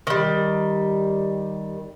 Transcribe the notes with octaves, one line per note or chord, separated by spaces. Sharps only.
D#3 G3